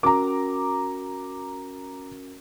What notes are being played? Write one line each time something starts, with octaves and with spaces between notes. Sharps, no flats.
C#4 F#4 A#4 A#5 D6